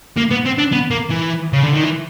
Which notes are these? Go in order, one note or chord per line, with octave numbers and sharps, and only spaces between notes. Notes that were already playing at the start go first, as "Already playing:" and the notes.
A#3
B3
C4
D4
B3
A#3
E3
C#3
D3
D#3
E3